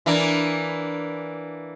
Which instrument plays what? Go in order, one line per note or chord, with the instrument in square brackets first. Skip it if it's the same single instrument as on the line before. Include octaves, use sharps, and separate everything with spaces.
[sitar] E3 A#3 D4